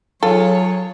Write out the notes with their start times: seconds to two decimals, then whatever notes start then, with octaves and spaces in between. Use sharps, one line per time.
0.23 F#3 F4 G#4 A4 C#5